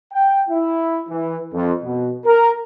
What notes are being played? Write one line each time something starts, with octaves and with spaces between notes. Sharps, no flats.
G5
E4
E3
F2
B2
A#4